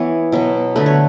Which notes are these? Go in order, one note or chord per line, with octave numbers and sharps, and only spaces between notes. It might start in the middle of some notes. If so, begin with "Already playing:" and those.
Already playing: E3 B3 C#5
B2 F#3 B3
D3 A3 B4
C#5